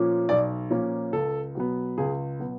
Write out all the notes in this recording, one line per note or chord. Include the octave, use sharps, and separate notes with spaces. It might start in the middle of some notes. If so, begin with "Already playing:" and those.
Already playing: A#2 F3 A#3 C#4
B1 D5
A#2 F3 A#3 C#4
C#2 A4
B2 F#3 B3
C#2 G#4
B2 F#3 B3